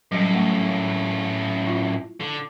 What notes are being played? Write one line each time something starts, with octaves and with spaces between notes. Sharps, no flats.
F#2 A2 F#3 G3
A3
E4 F4
D3